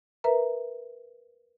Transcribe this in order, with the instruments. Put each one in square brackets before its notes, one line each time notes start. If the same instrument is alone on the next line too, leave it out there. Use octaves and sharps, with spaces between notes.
[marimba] A#4 B4 E5 A#5